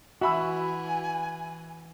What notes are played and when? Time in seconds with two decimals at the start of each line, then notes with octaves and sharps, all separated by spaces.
0.21 E3 F#4 E5 G#5 B5 E6